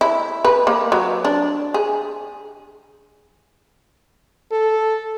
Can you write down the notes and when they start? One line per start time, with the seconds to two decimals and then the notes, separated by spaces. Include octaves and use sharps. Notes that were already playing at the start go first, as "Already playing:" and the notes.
0.01 E4
0.45 B4
0.67 A#3
0.92 F#3
1.25 D4
1.74 G#4
4.52 A4